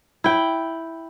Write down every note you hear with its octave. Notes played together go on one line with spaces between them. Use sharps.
E4 G5